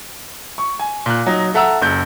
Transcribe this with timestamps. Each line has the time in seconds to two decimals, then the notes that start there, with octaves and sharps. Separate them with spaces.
0.58 C#6
0.80 G#5
1.06 A#2 F#6
1.26 F#3 D#4
1.54 A4 E5 F#5 A#5 E6
1.82 F#1 G6